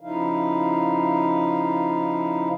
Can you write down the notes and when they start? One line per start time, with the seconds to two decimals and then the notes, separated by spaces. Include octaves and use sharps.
0.01 C#3 F3 D#4 E4 F5